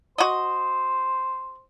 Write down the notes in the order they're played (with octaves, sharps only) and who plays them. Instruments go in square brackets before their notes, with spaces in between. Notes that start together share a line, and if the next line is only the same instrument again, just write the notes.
[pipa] F#4 D#5 [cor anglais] C5